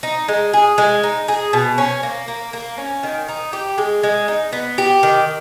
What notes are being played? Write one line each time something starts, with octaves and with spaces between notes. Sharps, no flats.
D#4
G#3
G#4
G#3
D#4
G#4
B2
C#4
A#3
A#3
A#3
C#4
D#3
D#4
G4
G#3
G#3
D#4
B3
G4
D#3